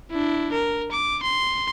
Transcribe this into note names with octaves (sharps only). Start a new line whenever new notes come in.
D4 E4
A#4
D6
C6